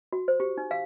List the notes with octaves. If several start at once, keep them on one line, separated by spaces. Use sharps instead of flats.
F#4
C5
G4
D#4
F5